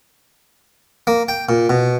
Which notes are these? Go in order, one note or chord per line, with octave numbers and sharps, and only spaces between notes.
A#3
G5
A#2
B2